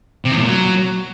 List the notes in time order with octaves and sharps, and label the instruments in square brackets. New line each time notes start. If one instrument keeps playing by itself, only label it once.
[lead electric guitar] C3
E2
A2
A#2
F#3